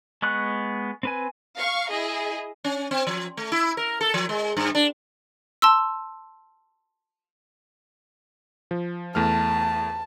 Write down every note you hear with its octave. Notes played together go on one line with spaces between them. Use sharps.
G#3 B3 C#6 F#6
C4 B4 G#5
F5 C#6
E4 G#4 D#5
C#4
C4
F3
A3
E4
A#4
A4
F3
G#3
G2
D4
A5 C6 E6
F3
E2 A3 A5 F6